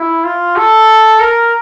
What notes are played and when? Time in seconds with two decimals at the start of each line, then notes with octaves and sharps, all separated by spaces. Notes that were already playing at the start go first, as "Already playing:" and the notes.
Already playing: E4
0.24 F4
0.56 A4
1.20 A#4